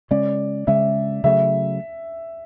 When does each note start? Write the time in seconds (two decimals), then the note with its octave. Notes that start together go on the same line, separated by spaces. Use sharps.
0.11 C#3 G#3 C#4 D5
0.67 C#3 G#3 C#4 E5
1.24 C#3 F#3 A3 E5